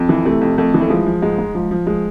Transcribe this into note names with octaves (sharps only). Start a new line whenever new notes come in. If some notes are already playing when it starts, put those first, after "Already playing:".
Already playing: F2
E3
C3 A3
F2
F2 A3
E3
A3
F3 G#3
F3
G#2 G#3
G#2
F3
F3
G#3